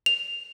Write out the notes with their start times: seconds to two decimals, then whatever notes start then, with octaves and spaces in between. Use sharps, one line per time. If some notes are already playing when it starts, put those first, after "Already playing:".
0.06 F7